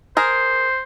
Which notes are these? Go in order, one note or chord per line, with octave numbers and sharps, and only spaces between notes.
G#4 A#4 C5